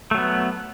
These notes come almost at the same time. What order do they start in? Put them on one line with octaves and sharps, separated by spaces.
A3 F#3 B3